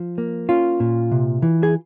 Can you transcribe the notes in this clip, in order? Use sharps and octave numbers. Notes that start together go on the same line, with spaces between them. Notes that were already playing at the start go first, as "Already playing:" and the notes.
Already playing: F3
A#3
C#4 F4
A#2
C3
E3
G#4